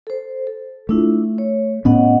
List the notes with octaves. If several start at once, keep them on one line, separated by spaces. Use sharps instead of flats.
A4 C5
A4
A3 D4 E4 F4
C#5
A2 B3 C#4 D#5 F#5